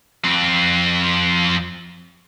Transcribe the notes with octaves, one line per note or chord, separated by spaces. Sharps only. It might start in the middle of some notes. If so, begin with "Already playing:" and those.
F2 C4